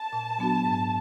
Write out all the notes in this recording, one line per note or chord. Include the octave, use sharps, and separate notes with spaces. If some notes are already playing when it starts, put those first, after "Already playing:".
Already playing: A5
A#2
F#3 B3 D4 F#4
G#2